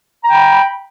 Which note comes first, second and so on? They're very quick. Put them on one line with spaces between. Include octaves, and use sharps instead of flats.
A#5 G5 B5